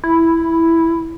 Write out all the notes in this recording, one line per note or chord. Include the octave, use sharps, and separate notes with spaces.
E4